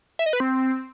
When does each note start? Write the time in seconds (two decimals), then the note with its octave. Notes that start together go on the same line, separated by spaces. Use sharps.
0.19 E5
0.26 D#5
0.33 B4
0.40 C4